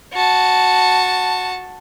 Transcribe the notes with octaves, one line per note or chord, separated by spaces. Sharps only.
F#4 A5